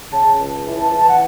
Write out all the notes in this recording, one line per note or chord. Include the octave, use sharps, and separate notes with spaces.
C#3 A5
C#2
E3
A5
E3
F#5